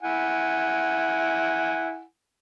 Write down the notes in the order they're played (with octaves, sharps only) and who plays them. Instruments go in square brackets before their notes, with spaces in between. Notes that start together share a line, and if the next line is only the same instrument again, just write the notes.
[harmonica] E4 F#5 G#5